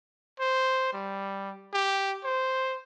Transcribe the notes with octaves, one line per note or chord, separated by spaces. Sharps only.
C5
G3
G4
C5